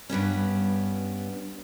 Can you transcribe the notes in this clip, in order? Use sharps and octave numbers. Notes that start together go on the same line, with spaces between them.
G2 G3 B3 C#4